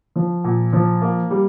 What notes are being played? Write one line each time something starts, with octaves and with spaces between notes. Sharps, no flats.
F3
A#2
F3
A#3
G3